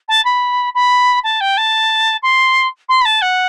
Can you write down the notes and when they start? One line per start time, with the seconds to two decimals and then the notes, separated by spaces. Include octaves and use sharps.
0.08 A5
0.25 B5
0.75 B5
1.24 A5
1.40 G5
1.57 A5
2.23 C6
2.89 C6
3.01 B5
3.05 A5
3.22 F#5